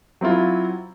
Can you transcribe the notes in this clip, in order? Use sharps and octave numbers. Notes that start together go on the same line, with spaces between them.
F#3 C4 E4 F4